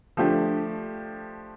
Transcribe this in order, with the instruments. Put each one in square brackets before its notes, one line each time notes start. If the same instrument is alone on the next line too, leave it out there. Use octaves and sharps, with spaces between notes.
[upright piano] F3 A3 D4 G4